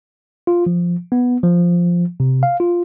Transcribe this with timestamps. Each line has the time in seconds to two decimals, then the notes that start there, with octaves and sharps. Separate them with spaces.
0.47 F4
0.66 F3
1.12 B3
1.43 F3
2.20 C3
2.43 F5
2.60 F4